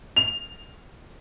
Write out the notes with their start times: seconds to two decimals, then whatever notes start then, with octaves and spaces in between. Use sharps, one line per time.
0.16 F7